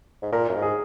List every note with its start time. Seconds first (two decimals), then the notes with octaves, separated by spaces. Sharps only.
0.22 G#2
0.33 A#2 A#4
0.49 F#2
0.56 G#2
0.62 G#4